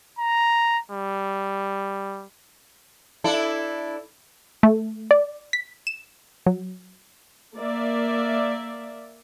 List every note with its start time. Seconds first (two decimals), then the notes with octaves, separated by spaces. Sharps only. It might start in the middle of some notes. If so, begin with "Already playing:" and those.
0.19 A#5
0.92 G3
3.24 D4 E4 A4
4.63 A3
5.11 D5
5.53 B6
5.87 E7
6.46 F#3
7.56 A#3 D5 E5